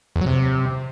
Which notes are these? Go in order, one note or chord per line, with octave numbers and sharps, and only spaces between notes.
E2
F#3
C3